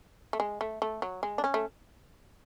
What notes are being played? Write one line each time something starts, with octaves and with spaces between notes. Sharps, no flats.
A3
G#3
A3
A3
F#3
G#3
D4
C#4
A3